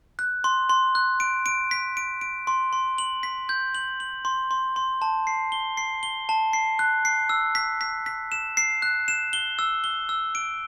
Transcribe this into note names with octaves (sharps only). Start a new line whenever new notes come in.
F#6
C6
C6
F#6
D7
D7
B6
D7
D7
C6
C6
F#7
B6
G6
F#7
F#7
C6
C6
C6
A5
C7
G7
C7
G7
A5
C7
F#6
C7
E6
B6
B6
B6
E7
C7
F#6
E7
G7
E6
G7
E6
D7